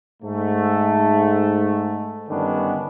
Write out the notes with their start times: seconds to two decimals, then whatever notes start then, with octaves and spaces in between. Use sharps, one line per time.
0.23 G#2 A3
2.29 G2 D3 D#3 B3 C#4 D4